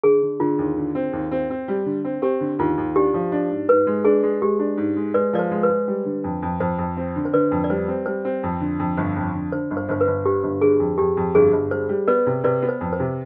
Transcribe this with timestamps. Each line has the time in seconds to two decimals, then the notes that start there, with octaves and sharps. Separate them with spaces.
0.04 D3 G#4
0.22 D3
0.40 D3 F4
0.58 D#2
0.77 D3
0.95 C4
1.13 D#2
1.31 C4
1.50 C4
1.68 G3
1.86 D3
2.05 C4
2.22 C4 G4
2.41 D3
2.59 D#2 F4
2.77 D#2
2.96 D4 G4
3.14 F3
3.32 D4
3.50 G#2
3.68 G#2 B4
3.87 G#3
4.05 D4 G#4
4.23 G#3
4.42 G#3 G4
4.59 D4
4.77 G#2
4.96 G#3
5.14 G#3 B4 D5
5.33 F3 D5
5.39 C5
5.51 G#3
5.63 B4
5.69 G#3
5.88 G3
6.05 D3
6.24 F2
6.43 F2
6.60 F2 C5
6.79 F2
6.97 C4
7.16 D3
7.25 C5
7.33 D3 B4 D5
7.51 F2
7.64 D5
7.70 G3 C5
7.88 C4
8.06 G3 C5
8.25 C4
8.43 F2
8.61 D3
8.80 F2
8.97 G1
9.16 F2
9.34 D3
9.52 D3 C5
9.71 G1
9.77 C5
9.89 G1 C5
10.01 B4
10.07 G1
10.25 D3 G4
10.43 G1
10.61 D3 G#4
10.80 F2
10.98 F2 G4
11.17 F2
11.35 G1 G#4
11.53 G1
11.71 G3 C5
11.89 G3
12.08 B3 B4 D5
12.26 C3
12.44 C3 B4 D5
12.62 B3
12.69 C5
12.81 F2
12.93 C5
13.00 C3